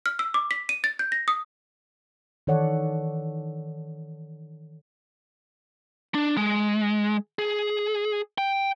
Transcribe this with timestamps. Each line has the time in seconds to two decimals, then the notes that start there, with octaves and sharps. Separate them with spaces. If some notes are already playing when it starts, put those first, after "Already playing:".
0.06 F6
0.19 E6
0.34 D6
0.51 B6
0.69 D#7
0.84 A6
0.99 G6
1.12 A#6
1.28 D#6
2.47 D#3 E3 A4 C#5 D5 F#5
6.15 D4
6.37 G#3
7.39 G#4
8.38 G5